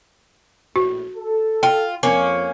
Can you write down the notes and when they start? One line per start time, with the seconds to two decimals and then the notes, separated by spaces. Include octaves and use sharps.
0.76 A#1 A2 F#4
1.16 A4
1.63 F4 G5
2.03 F2 A#3 C#4